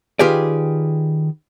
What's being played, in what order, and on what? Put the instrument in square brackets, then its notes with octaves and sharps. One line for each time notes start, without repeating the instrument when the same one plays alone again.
[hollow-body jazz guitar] D#3 F4 G4 G#4 B4 D5